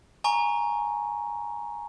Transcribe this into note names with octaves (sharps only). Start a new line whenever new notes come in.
G#5 A#5 C#6